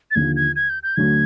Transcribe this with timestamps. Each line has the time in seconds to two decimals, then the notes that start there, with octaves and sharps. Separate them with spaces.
0.11 A6
0.15 D#2 D3 F3 G#6
0.36 G#6
0.56 G#6
0.70 G6
0.83 G6
0.96 D2 D3 F#3 A3 G#6